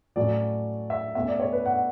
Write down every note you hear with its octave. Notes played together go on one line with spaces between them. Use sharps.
A2 F#3 A3 C#4 D5
E5
B2 A3 C#4 E5
D5
C#5
B4
F#5